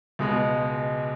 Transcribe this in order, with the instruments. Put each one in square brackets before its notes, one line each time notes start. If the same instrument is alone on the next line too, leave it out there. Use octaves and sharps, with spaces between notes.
[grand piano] C#2 B2 G#3